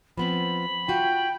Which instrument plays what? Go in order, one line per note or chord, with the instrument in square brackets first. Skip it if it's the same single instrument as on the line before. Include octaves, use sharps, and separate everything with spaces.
[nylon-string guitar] F3 B3 C4 [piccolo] B5
[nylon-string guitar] F4 F#4 [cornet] G5